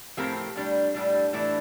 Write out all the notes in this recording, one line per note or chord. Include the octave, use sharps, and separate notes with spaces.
A2 F3 C4 G4 A#4
A2 G3 D4
A2 G3 D4
A2 E3 A3 D4